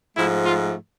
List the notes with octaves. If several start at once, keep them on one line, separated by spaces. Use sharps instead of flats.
G#2 F3 A3 E4
F4